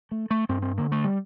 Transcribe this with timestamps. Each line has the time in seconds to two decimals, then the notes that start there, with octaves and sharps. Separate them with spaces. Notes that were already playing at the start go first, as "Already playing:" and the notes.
0.11 A3
0.31 A3
0.49 G2 C4
0.62 C4
0.78 D3 A#3
0.92 A3
1.04 G3